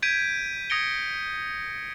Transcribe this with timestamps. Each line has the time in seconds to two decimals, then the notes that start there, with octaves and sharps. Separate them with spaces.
0.02 G6 G#6 B6 D7 D#7
0.70 D#6 G#6 A#6 C#7 D7 G7